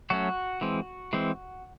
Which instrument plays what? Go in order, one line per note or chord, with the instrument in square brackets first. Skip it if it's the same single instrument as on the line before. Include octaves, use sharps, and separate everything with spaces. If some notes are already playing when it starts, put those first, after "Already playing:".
[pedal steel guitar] F#3 A3 C#4 F#4
E3 G#3 C4
E3 G#3 C4